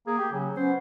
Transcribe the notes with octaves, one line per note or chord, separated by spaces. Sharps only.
A#3 G#4
G4
C#3 F#3
B3 C#4 C5